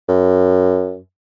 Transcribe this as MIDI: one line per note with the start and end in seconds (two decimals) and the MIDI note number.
0.09 0.98 42